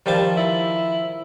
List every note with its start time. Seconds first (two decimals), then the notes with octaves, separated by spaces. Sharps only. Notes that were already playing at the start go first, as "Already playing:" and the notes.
0.06 D#3 F3 G3 A5
0.37 E4